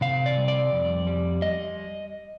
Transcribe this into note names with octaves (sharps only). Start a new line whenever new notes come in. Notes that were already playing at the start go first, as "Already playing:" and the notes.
C3 F5
D5
G3
D5
F2
G3
D#5